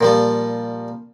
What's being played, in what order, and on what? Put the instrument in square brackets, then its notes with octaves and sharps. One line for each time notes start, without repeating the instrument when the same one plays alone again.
[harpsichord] A#2 F3 G3